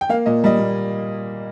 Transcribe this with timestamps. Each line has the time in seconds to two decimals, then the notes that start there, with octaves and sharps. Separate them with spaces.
0.01 G5
0.09 A#3 F5
0.26 A#2 D#5
0.44 G3 D#5
0.59 A#2